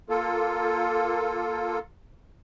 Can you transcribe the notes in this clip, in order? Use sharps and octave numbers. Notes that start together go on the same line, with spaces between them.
A#3 F4 A4